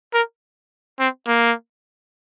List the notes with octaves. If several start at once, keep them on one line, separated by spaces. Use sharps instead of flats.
A#4
C4
A#3